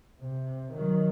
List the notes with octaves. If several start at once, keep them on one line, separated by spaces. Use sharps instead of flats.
C3
D#3 F#3